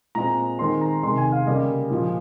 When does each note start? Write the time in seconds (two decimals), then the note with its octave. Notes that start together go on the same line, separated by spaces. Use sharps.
0.15 A#2 G#3 C4 A#5
0.59 D#3 G#3 C4 C6
0.81 A#5
1.03 C3 D#3 G#3 C6
1.18 G#5
1.32 F5
1.47 C#3 G3 A#3 D#5
1.90 A#2 F3 G#3